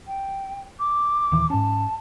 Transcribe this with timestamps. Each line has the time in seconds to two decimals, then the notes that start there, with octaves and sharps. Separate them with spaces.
0.07 G5
0.79 D6
1.32 D#1 D#3 E3
1.50 G#2 C#4 A5